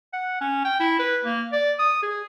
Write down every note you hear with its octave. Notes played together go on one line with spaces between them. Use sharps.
F#5
C#4
G5
E4
B4
A#3
D5
D#6
G#4